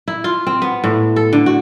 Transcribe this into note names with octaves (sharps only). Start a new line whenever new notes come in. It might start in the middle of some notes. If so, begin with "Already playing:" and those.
E4
F4
C4
B3
A2
A4
D3
F#4